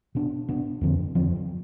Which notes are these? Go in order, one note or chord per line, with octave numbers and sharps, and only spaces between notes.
B2 B3 D4
B2 B3 D4
F2 D3 F3 C4
F2 D3 F3 C4